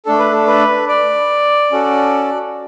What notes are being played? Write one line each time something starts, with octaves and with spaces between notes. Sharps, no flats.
A3 D4 A4
B4
A4
B4
D5
C#4 F#4 A4